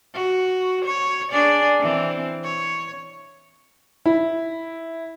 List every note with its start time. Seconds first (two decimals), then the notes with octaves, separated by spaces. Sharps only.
0.14 F#4
0.85 C#5
1.32 D4 G#4 D5
1.79 E3 C4
2.44 C#5
4.06 E4